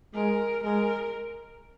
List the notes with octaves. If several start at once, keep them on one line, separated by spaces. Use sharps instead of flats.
G#3 A#4
G#3 A#4